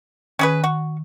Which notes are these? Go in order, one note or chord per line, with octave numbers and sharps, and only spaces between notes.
D#3 C#4 G#4 B4
F#4